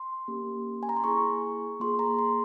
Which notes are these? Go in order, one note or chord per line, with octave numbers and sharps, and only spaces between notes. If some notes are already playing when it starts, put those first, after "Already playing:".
Already playing: C6
A#3 C#4 G4
G#5
A#5
C6
A#3 E4 G#4 C#6
A#3 F4 G#4 C6
A#5
C6